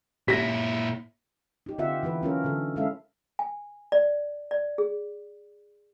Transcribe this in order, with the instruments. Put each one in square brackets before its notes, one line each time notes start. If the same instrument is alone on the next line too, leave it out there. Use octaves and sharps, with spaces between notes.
[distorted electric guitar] A#2 E4 [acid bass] G4 [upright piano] A#6 B6
[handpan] D#4 G4
D3 C4 F4 G4 E5 F#5
E3 E4 F4 B4
F#3 C#4 F4 A#4
D3 D#3 A4
G#3 C#4 E4 A4 E5 F5
[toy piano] G#5
D5
D5
G#4